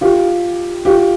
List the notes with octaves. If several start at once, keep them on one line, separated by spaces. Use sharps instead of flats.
F4 G4
F4 G4